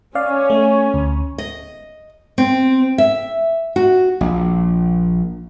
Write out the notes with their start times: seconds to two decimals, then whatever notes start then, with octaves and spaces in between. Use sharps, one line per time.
0.15 C#4 D5 F5
0.50 A3
0.94 D2
1.38 D#5
2.38 C4
2.98 E5
3.76 F#4
4.21 A#1